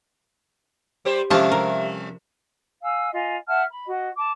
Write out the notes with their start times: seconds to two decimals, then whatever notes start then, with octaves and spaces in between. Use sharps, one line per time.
1.05 G3 G4 C5
1.31 C3 F3 G3 C#4 D4 E5 F5 A5
1.52 A#4
2.82 F5 G#5 E6
3.12 F4 D#5 G#5
3.47 E5 F#5 A5 F6
3.68 B5
3.86 F#4 D#5
4.17 A5 D6